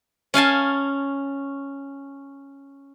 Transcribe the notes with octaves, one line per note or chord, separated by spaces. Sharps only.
C#4 F5 G#5 A5